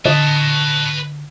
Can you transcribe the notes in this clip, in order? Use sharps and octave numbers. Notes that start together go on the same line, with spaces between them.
D3 B4 D#5 A5